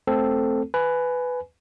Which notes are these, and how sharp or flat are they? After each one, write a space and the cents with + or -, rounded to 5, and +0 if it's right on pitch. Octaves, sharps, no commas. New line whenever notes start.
A3 +0 C4 +0 A4 +5
B4 +10 G#5 +15